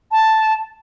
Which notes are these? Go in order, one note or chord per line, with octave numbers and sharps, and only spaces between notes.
A5